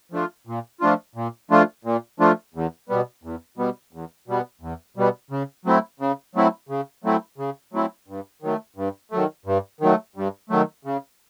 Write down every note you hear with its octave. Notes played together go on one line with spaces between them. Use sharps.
F3 A3 D4 F4
A#2
F3 A3 D4 F4
A#2
F3 A3 D4 F4
A#2
F3 A3 D4 F4
E2
B2 G3 B3
E2
B2 G3 B3
E2
B2 G3 B3
E2
B2 G3 B3
C#3
F#3 A3 C4 E4
C#3
F#3 A3 C4 E4
C#3
F#3 A3 C4 E4
C#3
F#3 A3 C4 E4
G2
D#3 F#3 A3
G2
D#3 F#3 A3
G2
D#3 F#3 A3
G2
D#3 F#3 A3
C#3